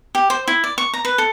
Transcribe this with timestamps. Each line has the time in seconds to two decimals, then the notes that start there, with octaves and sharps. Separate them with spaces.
0.15 G4
0.30 C5
0.48 E4
0.64 D5
0.78 C#6
0.94 A#5
1.05 B4
1.18 A4